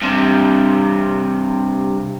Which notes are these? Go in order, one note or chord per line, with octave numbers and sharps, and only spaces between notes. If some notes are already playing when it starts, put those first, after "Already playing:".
G2 C3